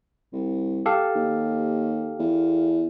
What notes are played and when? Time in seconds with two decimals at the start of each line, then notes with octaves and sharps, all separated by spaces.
0.33 C2
0.86 G4 A4 F5
1.15 D#2
2.19 E2